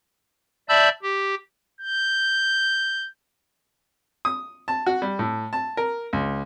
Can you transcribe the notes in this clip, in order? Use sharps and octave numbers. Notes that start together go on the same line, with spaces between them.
D5 E5 A5 B5 E6 G6
G4
G6
D#6
A5
F#4
G3
A2
A5
A#4
C#2